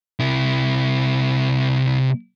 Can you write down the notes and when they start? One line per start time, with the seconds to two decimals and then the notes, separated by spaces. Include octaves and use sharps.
0.19 C3 E4